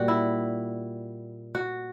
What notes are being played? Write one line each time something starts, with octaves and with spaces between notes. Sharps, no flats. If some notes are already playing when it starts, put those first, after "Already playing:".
Already playing: A#2 G3 F#4
E4
F#4